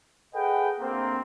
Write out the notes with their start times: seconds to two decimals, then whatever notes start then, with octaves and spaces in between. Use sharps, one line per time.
0.34 G#4 A4 B4 D#5 F#5 G5
0.80 D2 A#3 C4